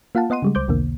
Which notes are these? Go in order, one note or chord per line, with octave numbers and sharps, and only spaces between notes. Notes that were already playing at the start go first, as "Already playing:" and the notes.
A#3 F4 F5 F#5 A5
B3 D#5 F#5 C6 D#7
C#3 G3 G#3
C#2 C5 D6 G6
B1 E2 B2 D3 A#3